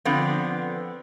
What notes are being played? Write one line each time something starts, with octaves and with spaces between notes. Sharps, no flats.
D3 F3 B3 C4